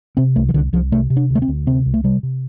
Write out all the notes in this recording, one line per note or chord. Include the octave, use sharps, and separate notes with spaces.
C3 C4
C2 A3
F3
C2 D3
C2 F3
C3 A3
C3
D4
D2
A3
C4
D2
C3 C4
C2
A3
C3 G3
C3